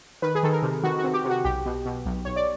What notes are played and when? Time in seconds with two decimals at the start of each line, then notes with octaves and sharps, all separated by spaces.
0.22 D#3 B4
0.35 G#4
0.43 D#3 A4
0.53 A#4
0.62 C3
0.83 D#3 F#4
0.98 F#4
1.04 C3
1.13 G4
1.25 C3 F#4
1.44 B1 G4
1.66 B2
1.85 B2
2.06 B1
2.25 B1 C#5
2.36 D5